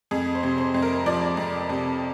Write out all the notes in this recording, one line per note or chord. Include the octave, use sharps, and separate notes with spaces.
F2 G#4
C5
C3
C5
F2
A#4
F3 D5
F2
C3